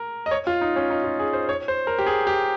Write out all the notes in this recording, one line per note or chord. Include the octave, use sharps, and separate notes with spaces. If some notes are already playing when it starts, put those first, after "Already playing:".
Already playing: A#4
D#5
C#5
F4
D#4
C#4
D#4
F4
G#4
C5
C#5
C5
A#4
G4
G#4
G4